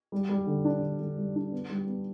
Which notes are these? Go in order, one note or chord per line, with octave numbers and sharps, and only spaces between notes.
G3
G3
D3
D4
D3
D3
G3
D4
B3
G3
B3